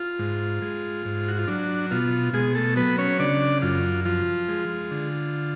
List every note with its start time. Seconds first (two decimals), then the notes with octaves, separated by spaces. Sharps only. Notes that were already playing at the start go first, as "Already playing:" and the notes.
Already playing: F4
0.19 G#2
0.62 G#3
1.05 G#2
1.28 F#4
1.39 F4
1.48 F#3 D4
1.91 B2 F4
2.33 B2 G#3 G#4
2.55 A3 A4
2.76 F#3 B3 B4
2.98 C#4 C#5
3.19 C#3 D4 D5
3.62 F#2 F4
4.05 F3 F4
4.48 G#3
4.91 D3